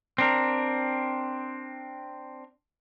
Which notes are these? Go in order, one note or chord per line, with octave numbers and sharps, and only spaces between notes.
C4 D4 A#4